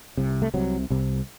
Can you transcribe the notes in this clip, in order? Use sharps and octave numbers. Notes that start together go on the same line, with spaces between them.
C2 C3
A3
C2 C3 F#3
C2 C3